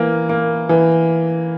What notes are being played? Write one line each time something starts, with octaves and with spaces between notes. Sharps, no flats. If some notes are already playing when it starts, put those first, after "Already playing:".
Already playing: E3 A#3
A#3
E3